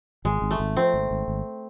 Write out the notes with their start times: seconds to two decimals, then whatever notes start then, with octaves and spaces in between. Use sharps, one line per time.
0.25 G#1 G#3
0.42 G#1
0.51 A3
0.60 G#1
0.76 F3 C4
0.94 G#1
1.11 G#1
1.28 G#1